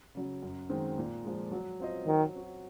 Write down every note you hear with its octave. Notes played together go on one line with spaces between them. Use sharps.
C#3 F#3
F#2
D#3 G#3 C4
A#2
F3 G#3
F#3
C4 F4 C5 D#5
D#3 F#3
C4 F#4